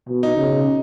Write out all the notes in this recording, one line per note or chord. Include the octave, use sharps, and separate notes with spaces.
B2
D#4
C#3